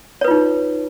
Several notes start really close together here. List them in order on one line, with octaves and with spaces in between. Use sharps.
C#5 B4 F4 D#4